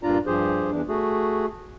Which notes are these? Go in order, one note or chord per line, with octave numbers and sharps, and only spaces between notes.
G2 A#2 D4 F4 D5 A#5
G2 F3 G4 G#4 C5
E2 E3 D4
A3 F#4 G#4